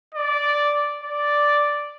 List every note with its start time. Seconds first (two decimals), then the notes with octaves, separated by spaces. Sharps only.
0.14 D5
1.04 D5